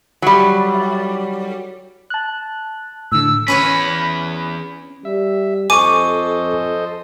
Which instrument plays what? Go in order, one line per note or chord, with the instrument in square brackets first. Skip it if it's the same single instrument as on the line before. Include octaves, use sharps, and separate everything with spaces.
[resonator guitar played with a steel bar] F#3 G3
[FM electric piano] A5 F#6
[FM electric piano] A2 D3 [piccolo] E6
[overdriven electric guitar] E2 B5 [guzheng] C#4 B4 C#5
[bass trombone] G3 [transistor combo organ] E5
[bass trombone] F2 [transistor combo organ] A4 C5 D#5 [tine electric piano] G#5 C#6 [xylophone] D6 D#7